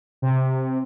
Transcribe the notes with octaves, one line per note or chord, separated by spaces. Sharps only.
C3